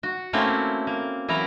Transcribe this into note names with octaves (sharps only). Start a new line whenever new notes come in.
F#4
A3 A#3 C4 C#4 E4
A#3
E3 F#3 E4 A#4 A#5